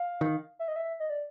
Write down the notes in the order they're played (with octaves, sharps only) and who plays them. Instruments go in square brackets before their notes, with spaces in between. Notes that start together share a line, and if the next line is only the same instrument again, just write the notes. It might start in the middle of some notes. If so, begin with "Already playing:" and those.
Already playing: [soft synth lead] F5
[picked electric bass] D#3
[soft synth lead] E5
D#5
E5
D#5
D5